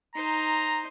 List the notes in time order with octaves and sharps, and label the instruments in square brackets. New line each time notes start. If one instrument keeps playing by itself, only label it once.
[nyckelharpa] D#4 C5 [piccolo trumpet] A#5